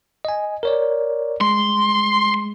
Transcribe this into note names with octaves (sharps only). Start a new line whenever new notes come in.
D#5 G#5
A#4 C#5 D5
G#3 C6